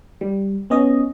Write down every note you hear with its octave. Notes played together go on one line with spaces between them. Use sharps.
G3
B3 C#4 D#5